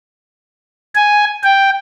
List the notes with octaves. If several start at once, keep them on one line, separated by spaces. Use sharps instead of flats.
G#5
G5